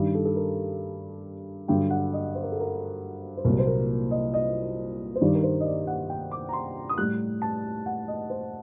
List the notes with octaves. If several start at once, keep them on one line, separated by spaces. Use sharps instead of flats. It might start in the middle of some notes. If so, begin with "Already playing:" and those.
Already playing: G2 D#3 G3
A4
A4
A#4
G2 D3 F#3 G5
F#5
D#5
C5
A#4
A4
A#4
C5
C2 A#2 F#3 A#4
C5
A#4
D#5
D#5
C5
G2 D#3 G3 D5
A#4
C5
D#5
D5
F#5
G5
D6
A#5
C6
D#6
A2 G3 F#6
A5
F#5
D#5
C5